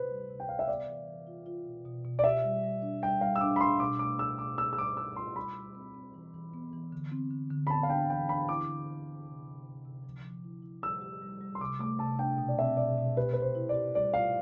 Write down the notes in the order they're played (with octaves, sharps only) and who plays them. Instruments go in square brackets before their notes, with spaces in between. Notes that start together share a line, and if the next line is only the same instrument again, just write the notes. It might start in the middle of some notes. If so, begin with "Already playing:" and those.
Already playing: [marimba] C3 [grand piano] B4 C5
[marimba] G3
C3
[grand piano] G5
[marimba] C3 [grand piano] F5
[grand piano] E5
[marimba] B3 [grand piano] D5
[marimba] E3
E3
F4
F4
B2
B2
B2
[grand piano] D5
[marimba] G4 [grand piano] E5
[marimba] G3
G3
D4
[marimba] G3 [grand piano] G5
[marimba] G3 [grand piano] F5
[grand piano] E6
[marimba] D4 [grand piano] D6
[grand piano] B5
[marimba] D4 [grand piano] C6
[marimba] B2 [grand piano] D6
[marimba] A3 [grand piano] D6
[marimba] D4 [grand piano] E6
[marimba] B2 [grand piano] D6
[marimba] G3 [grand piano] E6
[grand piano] E6
[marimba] G3 [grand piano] D6
[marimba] G3 [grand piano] E6
[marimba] F4 [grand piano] C6
[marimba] G3 [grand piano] B5
[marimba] G3
C4
C4
E3
E3
B3
E3
D3
C4
D3
D3
[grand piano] B5
[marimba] B3 [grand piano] A5
[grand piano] F5
[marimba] D4 [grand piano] G5
[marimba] E3 [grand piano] G5
[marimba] D4 [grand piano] B5
[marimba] E4 [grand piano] D6
[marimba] D3
D3
D3
C3
C3
C3
C3
F3
F3
E4
E4
[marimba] G3 [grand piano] E6
[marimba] G4
G3
G3
[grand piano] C6
[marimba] C3 [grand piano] D6
[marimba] A3 [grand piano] D6
[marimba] C3 [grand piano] A5
[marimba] D4 [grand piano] G5
[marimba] B2
[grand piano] D5
[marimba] C4 [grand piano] E5
[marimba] B2 [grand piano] D5
[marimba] B2
[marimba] G4 [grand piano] B4
[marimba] B2 [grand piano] B4
[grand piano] C5
[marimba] E4
[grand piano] D5
[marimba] G4
[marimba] G3 [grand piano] D5
[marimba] F4 [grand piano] F5